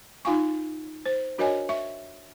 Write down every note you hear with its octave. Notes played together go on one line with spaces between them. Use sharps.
D#4 F4 F5 G#5 C#6
C5
D4 F#4 A#4 C#5 D#5 G#5
E5 C#6